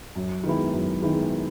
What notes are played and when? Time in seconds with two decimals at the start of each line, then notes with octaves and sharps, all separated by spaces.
0.16 F#2
0.44 D#3 G#3 B3 E4
0.73 F#2
1.02 D#3 G#3 B3 E4